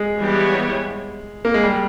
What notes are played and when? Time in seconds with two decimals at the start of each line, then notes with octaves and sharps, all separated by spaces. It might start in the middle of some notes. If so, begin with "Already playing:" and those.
Already playing: G#3
0.17 E3 G3 B3 G4 C#5
1.45 A#3
1.54 G#3
1.63 G3